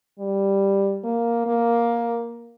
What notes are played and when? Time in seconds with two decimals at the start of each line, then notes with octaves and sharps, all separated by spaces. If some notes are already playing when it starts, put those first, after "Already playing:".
0.19 G3
1.04 A#3
1.47 A#3